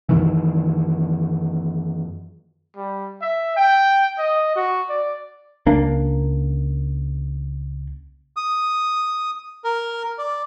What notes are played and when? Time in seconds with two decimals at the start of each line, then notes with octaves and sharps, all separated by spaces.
0.09 F#2 C3 D#3 E3
2.76 G3
3.22 E5
3.56 G5
4.18 D#5
4.56 F#4
4.89 D5
5.66 C#2 A#3 D4
8.36 D#6
9.64 A#4
10.18 D5